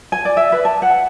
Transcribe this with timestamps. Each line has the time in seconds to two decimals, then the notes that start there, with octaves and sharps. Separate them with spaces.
0.12 G#5
0.25 D5
0.37 E5
0.52 B4
0.65 A5
0.82 F#5